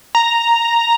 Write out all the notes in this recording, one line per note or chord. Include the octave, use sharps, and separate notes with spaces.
A#5